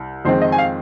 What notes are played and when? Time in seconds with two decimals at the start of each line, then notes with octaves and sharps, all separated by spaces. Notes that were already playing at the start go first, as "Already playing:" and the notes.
Already playing: C2
0.25 F2 D#3 G#3 C4 C5
0.42 D#5
0.52 G#5
0.58 F5